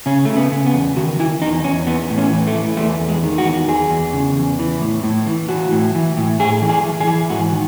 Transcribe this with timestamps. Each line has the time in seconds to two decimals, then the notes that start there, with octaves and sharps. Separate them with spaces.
0.06 C#3 C#4
0.25 C#3 A3
0.37 B3
0.52 C#3
0.66 B3
0.74 E2
0.97 D#3 F#4
1.20 D#3 E4
1.42 E2 D#4
1.64 E2 C#4
1.87 E3 B3
2.10 A2
2.18 C#4
2.33 E3
2.47 A3
2.55 E3
2.77 E2 A3
3.00 E2
3.08 G#3
3.23 D#3
3.38 F#4
3.45 E2
3.68 E2 G#4
3.90 E2
4.13 C#3
4.37 E2
4.59 E3
4.81 A2
5.04 A2
5.26 E3
5.49 E3 F#4
5.72 A2
5.95 E3
6.17 A2
6.39 A2 G#4
6.61 E3
6.69 G#4
6.85 E3
7.00 G#4
7.07 E3
7.30 G#2 F#4
7.52 D#3